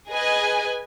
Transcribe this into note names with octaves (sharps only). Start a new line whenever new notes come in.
G#4 B4 D#5 G#5